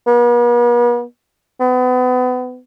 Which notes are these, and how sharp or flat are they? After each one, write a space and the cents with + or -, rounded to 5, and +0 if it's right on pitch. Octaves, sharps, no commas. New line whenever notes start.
B3 -45
B3 +30